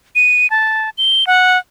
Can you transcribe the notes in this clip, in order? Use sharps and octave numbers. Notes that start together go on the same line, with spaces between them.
D#7
A5
G7
F#5